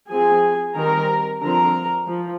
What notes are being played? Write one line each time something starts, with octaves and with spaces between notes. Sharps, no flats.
F3 C4 G#4 G#5
D#3 G3 C4 A#4 A#5
D3 F3 C4 A#4 A#5
F3